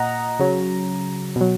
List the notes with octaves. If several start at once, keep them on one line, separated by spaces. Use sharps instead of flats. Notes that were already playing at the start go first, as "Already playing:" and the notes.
Already playing: A#2 D#5 F#5 A#5
C#3 F#3
B2 F#3